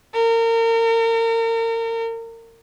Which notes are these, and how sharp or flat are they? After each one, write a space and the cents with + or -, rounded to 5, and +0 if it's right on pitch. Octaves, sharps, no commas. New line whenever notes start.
A#4 -35